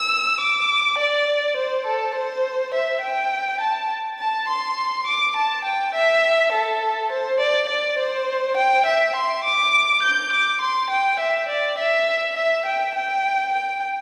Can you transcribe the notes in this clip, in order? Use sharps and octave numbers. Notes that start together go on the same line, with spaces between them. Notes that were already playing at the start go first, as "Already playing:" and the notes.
Already playing: E6
D6
D5
C5
A4
C5
E5
G5
A5
A5
C6
D6
A5
G5
E5
A4
C5
D5
D5
C5
G5
E5
C6
D6
G6
D6
C6
G5
E5
D5
E5
E5
G5
G5
G5